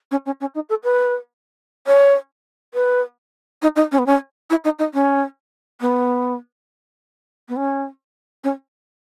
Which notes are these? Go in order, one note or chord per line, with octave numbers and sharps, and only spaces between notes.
C#4
C#4
C#4
D#4
A4
B4
C#5
B4
D#4
D#4
C#4
B3
C#4
E4
D#4
D#4
C#4
B3
B3
C#4
C#4